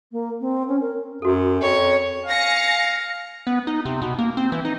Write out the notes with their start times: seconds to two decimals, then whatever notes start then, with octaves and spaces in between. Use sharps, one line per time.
0.12 A#3
0.41 C4
0.68 C#4
0.81 A#4
1.22 F#2 F#4 A4
1.61 F2 C#5
2.26 F5 G#5 A#6 C#7
3.47 B3
3.67 D#4
3.85 C3
4.02 B2
4.19 A#3
4.37 C4
4.52 E3
4.65 D#4